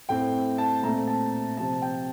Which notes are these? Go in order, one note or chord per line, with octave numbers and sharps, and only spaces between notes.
A2 A3 C4 G5
A5
A#2 A3 C4 A#5
A5
C3 F3 C4 A5
A5
G5